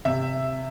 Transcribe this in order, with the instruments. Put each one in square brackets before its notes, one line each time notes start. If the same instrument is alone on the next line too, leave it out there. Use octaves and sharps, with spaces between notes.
[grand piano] C3 E5